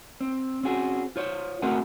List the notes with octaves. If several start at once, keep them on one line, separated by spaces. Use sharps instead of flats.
C4
C4 C#4 F#4 G#4
F4 C5 C#5
A3 C4 F#4 G#4 A#4 F#5